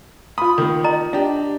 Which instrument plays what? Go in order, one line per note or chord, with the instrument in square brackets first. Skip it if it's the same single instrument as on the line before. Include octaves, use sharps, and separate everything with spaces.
[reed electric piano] F4 D#6 [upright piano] B5
[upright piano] D#3 A#3
[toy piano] D#5 A#5
[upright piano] D4 G4 [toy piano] E5